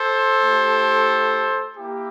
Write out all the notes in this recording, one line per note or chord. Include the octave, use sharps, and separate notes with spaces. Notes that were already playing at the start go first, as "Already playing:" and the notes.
Already playing: A4 C5
A3 E4 G4
A#3 E4 G4